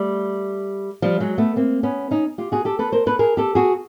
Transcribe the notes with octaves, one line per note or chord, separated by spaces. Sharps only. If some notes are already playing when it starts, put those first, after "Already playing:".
Already playing: G3 A3
F3 G3
F#3 G#3
A3 B3
A#3 C4
B3 C#4
C#4 D#4
F4 G4
F#4 G#4
G4 A4
A4 B4
A#4 C5
A4 B4
G#4 A#4
G4 A4
F#4 G#4